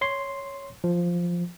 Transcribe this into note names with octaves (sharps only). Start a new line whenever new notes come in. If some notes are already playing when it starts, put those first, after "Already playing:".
C#5 C6
F3